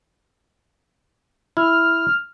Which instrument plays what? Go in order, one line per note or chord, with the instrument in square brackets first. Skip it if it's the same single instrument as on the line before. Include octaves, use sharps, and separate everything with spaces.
[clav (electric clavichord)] E4 [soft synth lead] F6